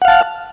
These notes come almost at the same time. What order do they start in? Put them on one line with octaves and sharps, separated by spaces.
F#5 F5 A5